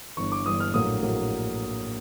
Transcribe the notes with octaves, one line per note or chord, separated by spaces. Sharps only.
G1 G2 E3 C#6
D6
G1 G2 E3 D#6
F6
A#1 A2 F#3 A#3 D#6
A#1 A2 F#3 A#3